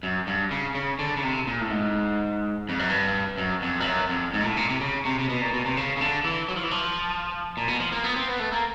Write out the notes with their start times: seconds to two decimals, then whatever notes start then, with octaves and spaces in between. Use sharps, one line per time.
0.03 F#2
0.27 G2
0.51 C#3
0.75 C#3
0.99 D3
1.17 C#3
1.23 C3
1.47 A#2
1.61 A2
1.70 G#2
2.69 F2
2.79 F#2
2.90 G2
3.38 F#2
3.62 F2
3.80 G2
3.86 F#2
4.09 F2
4.34 G#2
4.41 A#2
4.46 A2
4.57 A#2
4.69 C3
4.81 C#3
5.05 C3
5.19 C3
5.29 B2
5.41 A#2
5.54 B2
5.66 C3
5.77 C#3
5.97 C#3
6.01 D3
6.24 E3
6.48 F#3
6.56 F3
6.63 E3
6.71 F3
7.57 A#2
7.68 B2
7.80 F3
7.92 A#3
8.04 B3
8.16 C4
8.28 B3
8.39 A3
8.52 A#3